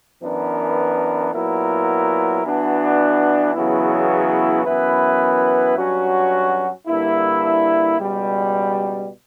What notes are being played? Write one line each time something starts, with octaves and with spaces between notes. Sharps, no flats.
F#2 E3 B3 D4 A#4
A#2 F#3 B3 E4 A#4
E3 B3 D4 F#4
E2 C#3 F#3 B3 E4
F#2 E3 B3 E4 B4
G2 F#3 C#4 F#4
G2 D3 A#3 E4
C#2 B2 G3